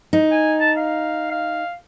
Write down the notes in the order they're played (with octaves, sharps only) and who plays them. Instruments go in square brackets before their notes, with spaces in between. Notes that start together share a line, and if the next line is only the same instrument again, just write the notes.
[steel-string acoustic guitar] D#4
[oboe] G#5
A5
F5
F5